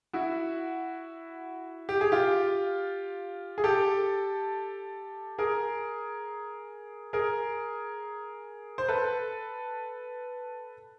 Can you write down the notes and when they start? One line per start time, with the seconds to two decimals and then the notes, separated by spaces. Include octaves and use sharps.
0.13 E4 F#4
1.89 G4
2.01 G#4
2.12 F4 G4
3.58 G#4
3.64 G4 A4
5.38 G#4 A#4
7.13 G#4 A#4
8.78 C5
8.88 A4 B4